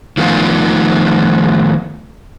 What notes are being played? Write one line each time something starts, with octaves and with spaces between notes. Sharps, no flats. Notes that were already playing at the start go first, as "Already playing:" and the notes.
D#3 F3 A3 B3 F4